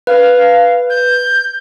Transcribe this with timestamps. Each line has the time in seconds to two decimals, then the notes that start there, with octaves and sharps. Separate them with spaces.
0.07 B4 F5
0.90 G6